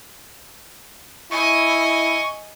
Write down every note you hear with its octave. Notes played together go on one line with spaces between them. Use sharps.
E4 D#5 G#5 C#6